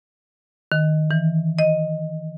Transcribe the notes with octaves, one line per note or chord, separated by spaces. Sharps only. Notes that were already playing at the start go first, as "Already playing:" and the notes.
D#3
E3
D#5